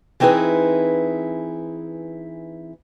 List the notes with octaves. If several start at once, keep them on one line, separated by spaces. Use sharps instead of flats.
E3 C4 D#4 E4 G#4 B4